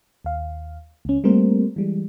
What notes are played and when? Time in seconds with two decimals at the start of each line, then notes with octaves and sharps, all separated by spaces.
0.24 D#2 F5
1.05 C#2 C#4
1.24 G3 A3 A#3 C4 A#4 C5
1.76 E3 G3 G#3